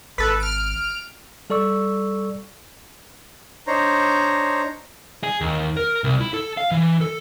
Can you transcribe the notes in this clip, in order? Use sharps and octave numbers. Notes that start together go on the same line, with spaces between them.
G#1 A4 B4
F6 D7
G3 A4 D5 C#6 E6
D4 D#4 C5 C#5 A#5
G#4
D#2
A#4
C2
E4
A4
F5
E3
A4